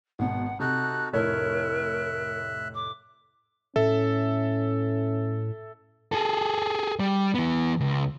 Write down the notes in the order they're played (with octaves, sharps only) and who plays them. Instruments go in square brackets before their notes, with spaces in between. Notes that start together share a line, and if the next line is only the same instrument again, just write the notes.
[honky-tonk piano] G#1 B2 [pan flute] F#5
[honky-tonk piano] C3 [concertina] D#4 F#4 A4 [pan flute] F#6
[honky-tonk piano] F1 A2 C#5 [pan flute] A#4 [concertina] E5 F#6
[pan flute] D6
[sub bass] A2 [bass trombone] C#4 [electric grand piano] A4 E5
[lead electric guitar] G#4 A4
G3
E3 B3
C#2